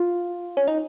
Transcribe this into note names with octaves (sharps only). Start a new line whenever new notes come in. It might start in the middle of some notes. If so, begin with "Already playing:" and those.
Already playing: F4
C#4
D#4